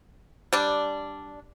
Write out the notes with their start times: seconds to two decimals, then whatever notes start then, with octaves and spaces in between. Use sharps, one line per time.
0.53 G3 D4